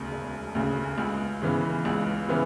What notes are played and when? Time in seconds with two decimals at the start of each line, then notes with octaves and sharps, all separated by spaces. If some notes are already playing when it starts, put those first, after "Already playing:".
Already playing: E1 D2 C#3
0.11 E1
0.55 D2 C#3
0.98 C#2
1.42 C#3 E3 B3
1.85 C#2
2.28 C#3 E3 B3